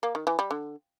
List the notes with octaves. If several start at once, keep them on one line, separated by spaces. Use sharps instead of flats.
A#3
D#3
E3
G3
D3